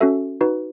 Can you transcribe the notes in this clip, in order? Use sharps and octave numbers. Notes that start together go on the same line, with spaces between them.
C#4 F#4 A4 E5
D#4 F#4 B4